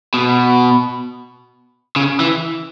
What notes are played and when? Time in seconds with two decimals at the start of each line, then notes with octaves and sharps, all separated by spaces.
0.14 B2
1.96 C#3
2.20 E3